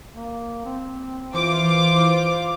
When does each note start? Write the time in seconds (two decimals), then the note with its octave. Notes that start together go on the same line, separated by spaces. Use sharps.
0.14 A#3
0.65 C4
1.34 E3 F4 C5 D6